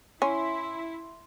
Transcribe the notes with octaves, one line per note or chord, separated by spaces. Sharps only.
C#4 E4 C6